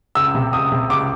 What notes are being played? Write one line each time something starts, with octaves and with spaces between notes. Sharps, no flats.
C#2 E6
C3
C#2 D#6
C3
C#2 D6